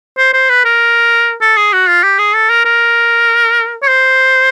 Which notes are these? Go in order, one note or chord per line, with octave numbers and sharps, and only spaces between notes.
C5
C5
B4
A#4
A4
G#4
F#4
F4
G4
G#4
A4
A#4
A#4
C#5
C5